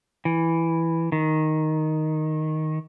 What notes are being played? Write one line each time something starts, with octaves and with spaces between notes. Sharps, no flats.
E3
D#3